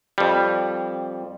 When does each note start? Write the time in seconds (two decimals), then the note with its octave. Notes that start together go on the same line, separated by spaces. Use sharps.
0.18 F2 G3